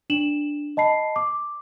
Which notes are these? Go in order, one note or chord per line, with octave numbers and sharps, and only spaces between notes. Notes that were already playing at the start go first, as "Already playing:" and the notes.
D4 E7 F#7
D#5 A5 B5 C7
D6